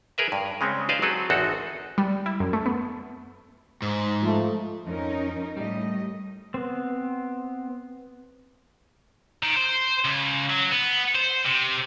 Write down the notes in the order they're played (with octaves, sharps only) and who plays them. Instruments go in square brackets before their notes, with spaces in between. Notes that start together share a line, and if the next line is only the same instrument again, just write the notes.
[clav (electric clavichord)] G#4 A#4 B4 E5
G2
C#3 G#3 C4 C#4
B4 C5 D5 D#5 F5 G#5
F#3 C4 G#4 A4 B4
G#1 E2 C4 D#4 F#4 A4
[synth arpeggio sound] G3
E4
F#2
A3
B3
[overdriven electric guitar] G#2
[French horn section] F3 A3
[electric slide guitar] F2 [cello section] C#4 D#4 A#4
[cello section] A2 A3 D#5 [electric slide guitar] G3
[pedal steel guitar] B3 C4
[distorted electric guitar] D#3
C5
C#2
F#3
B3
C5
C3